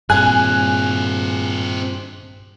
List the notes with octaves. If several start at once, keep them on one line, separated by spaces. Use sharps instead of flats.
G2 A#2 C4 G#4 G#5 F#6